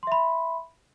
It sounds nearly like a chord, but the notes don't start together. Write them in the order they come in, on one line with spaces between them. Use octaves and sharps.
C6 E5 B5